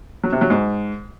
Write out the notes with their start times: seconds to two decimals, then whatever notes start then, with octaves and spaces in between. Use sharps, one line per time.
0.24 F#3
0.32 C3
0.41 F#3
0.50 G#2